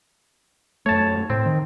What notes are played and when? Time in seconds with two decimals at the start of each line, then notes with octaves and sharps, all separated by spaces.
0.86 F#2 A3 C#5 A5
1.30 A2 C4
1.46 D#3